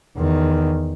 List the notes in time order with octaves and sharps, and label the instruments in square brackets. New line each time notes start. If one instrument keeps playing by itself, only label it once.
[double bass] E2 D#3